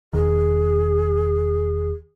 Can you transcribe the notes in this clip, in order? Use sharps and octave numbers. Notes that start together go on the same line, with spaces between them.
E1 E2 D#3 G#4